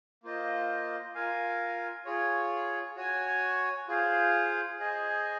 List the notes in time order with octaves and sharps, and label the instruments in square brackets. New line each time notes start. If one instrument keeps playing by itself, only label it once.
[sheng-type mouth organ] A#3 F4 C5 D#5
F4 A#4 F5 G#5
F4 G#4 C#5
F#4 C#5 G#5
F4 G#4 C5 F5
G#4 C5 D#5 G#5